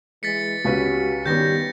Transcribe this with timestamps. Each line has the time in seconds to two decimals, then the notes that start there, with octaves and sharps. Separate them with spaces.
0.23 E3 G#3 A6 B6 C#7
0.64 C#2 C#4 F#4 G4 B4
1.26 D#3 G3 B3 C#4 G4 G6 A#6